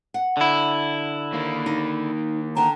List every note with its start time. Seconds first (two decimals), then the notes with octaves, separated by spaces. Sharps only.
0.14 F#5
0.37 D3 E4
1.33 D#3 A#3
1.66 D#4
2.57 D3 G5 A5 A#5